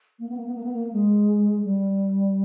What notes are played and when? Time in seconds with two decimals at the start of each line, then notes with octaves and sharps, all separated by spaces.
0.19 A#3
0.28 B3
0.36 A#3
0.46 B3
0.54 A#3
0.63 B3
0.73 A#3
0.92 G#3
1.64 G3